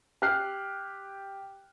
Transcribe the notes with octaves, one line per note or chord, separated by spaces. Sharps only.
G4 F6 F#6 C7